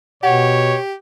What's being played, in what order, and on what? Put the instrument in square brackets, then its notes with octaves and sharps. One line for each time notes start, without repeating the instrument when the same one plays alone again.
[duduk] B2 [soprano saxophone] G4 [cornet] C#5 [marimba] F#5